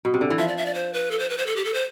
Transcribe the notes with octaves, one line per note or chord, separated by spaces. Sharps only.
B2
C3
D3
E3
F3 E5
D5
E5
D5
C5
B4
A4
C5
B4
C5
A4
G4
A4
C5